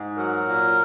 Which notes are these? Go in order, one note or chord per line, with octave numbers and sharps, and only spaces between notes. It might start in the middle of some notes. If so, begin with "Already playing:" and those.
Already playing: G#2
F#3 A#4
A#2